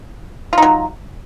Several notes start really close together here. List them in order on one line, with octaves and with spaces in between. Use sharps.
F4 D#4 F#3